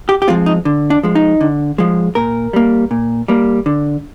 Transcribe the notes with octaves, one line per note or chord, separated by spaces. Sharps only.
G4
G4
F3 G#3 C4 F4
D#4
D3
D4
F3 G#3
D#4
D3
F3 G#3
A#2 A#4
G3 A#3
A#2
G3 A#3
D3